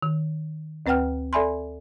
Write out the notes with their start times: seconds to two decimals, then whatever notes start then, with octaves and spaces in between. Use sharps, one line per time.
0.03 D#3
0.86 D2 C4 B4 F#5 G5 F6
1.33 A4 D5 E5 G#5 B5 C6